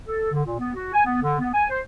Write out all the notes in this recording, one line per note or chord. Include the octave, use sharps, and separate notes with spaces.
A4
D3
A#2
B3
F#4
G#5
B3
D3
B3
G#5
C5